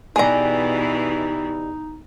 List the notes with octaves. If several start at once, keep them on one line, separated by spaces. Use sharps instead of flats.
B2 E3 D#4 G4 G#4 D5 D#5 A#5